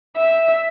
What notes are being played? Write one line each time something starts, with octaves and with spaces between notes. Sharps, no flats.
E5